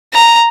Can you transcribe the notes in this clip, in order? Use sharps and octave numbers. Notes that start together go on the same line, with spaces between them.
A#5